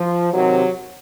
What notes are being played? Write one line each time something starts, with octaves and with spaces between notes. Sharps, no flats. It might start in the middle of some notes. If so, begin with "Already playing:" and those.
Already playing: F3
C3 D#3 F#3